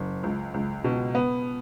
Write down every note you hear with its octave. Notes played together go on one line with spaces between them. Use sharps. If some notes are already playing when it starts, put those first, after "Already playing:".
Already playing: F#1
C#2
C#2
B2
B3